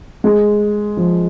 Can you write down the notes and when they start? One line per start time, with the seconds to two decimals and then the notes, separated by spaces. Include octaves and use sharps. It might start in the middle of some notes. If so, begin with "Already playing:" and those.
0.24 G#3
0.97 F3